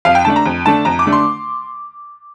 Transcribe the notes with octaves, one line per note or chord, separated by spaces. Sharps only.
F2 F5
G5
D3 A3 D4 A5
A#5
F2
D3 A3 D4 A5
F2 A#5
D6
D3 A3 D4
C6